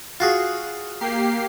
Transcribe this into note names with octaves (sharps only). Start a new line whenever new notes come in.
F4 F#4 G#4
A#3 G4 C7